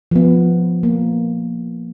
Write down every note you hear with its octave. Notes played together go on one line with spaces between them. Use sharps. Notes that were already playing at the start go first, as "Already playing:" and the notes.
F3 B3
A#3